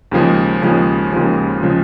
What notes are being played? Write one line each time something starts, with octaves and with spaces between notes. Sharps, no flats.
D#2 C#3 F3 G#3
D#2 C#3 F3 G#3
D#2 C#3 F3 G#3
C#3 F3 G#3